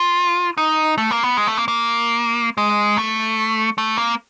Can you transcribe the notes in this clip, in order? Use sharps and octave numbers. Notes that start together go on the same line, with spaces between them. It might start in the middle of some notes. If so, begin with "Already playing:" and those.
Already playing: F4
D#4
A3
A#3
B3
G#3
A3
A#3
A#3
G#3
A3
A3
A#3